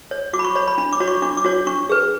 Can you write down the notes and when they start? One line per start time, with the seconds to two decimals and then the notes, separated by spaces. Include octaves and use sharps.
0.11 C#5
0.33 F#4 D6
0.39 B5
0.45 C#6
0.55 C#5 B5
0.68 B5
0.78 D4 B5
0.93 D6
1.00 F#4 C#5
1.08 C#6
1.22 D4 D6
1.37 D6
1.44 F#4 C#5
1.67 D4 C#6
1.89 G#4 B4